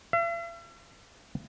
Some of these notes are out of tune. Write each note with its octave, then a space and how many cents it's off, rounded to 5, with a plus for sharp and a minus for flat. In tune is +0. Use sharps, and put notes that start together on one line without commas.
E5 +45